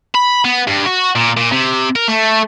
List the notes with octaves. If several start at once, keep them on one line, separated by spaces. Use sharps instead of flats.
B5
B3
G2
F#4
A#2
A#2
C3
A#4
A3